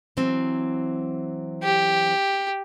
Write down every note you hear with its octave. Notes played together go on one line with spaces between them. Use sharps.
E3 F#3 C4
G4